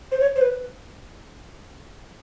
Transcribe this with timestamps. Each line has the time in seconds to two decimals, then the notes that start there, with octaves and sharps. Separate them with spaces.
0.12 C5
0.20 C#5
0.36 C5
0.41 B4